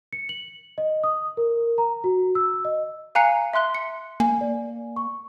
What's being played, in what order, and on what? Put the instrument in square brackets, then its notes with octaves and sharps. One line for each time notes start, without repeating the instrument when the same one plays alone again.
[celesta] C#7
F#7
D#5
D#6
A#4
A#5
F#4
E6
D#5
[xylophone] F5 G#5 A#5 F#6 C7 C#7
E5 C6 F#6 G7
C#7
[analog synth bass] A#3 [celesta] G#5
[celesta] D5
C#6